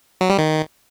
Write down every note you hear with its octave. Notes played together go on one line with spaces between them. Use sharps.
F#3
G3
D#3